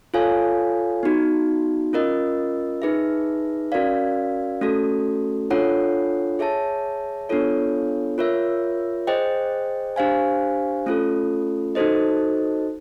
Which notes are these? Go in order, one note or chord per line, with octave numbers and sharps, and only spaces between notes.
F4 A4 C#5 F5 G#5
B3 D#4 F#4
C#4 F4 A#4 D#5
D#4 G#4 B4 E5
C#4 F#4 A#4 D5 F5
A3 C#4 F#4 A4
D4 F4 A4 C#5 F#5
G#4 C#5 E5 A5
B3 D4 F4 A4 C#5
F4 A#4 C#5 E5
G#4 C5 D#5 G5
D4 G4 C5 F5 G#5
A3 C#4 F4 A4
D#4 F#4 A4 C5 D#5